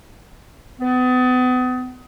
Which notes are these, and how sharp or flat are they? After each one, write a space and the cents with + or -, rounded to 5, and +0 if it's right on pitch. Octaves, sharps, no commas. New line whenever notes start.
B3 +35